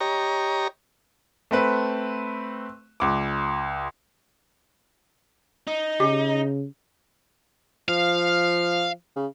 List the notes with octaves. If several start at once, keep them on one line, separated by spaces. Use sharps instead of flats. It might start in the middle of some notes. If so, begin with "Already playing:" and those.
G4 C#5 D#5 A#5
A3 C4 B4
C#2 D6
D#4
C#3 G4
F3 F5
C#3